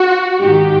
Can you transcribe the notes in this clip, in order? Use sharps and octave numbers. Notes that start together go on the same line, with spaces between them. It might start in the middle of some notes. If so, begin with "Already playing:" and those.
Already playing: F#4
G#2 D#3 G4